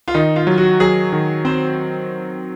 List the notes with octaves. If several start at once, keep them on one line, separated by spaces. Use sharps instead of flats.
F4
D#3 D#4
F4
F#3
F#4
F#3 G#4
D#3
C4 C5